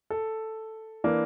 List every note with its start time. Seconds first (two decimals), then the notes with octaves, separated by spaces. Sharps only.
0.10 A4
1.04 E3 A#3 D4